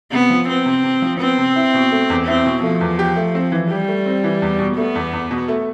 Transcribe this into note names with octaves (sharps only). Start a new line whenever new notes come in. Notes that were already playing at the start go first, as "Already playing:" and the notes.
C3 B3
F3
B3 C4
C3
C3
F3
B3 C4
C3
E4
B2
A3
E2
C4 E4
B2
F3 A3
E2
G4
A3
C4
E3
G3 G4
A3
C4
E3
E2
B2
A3 B3
E2
E2
B2
A3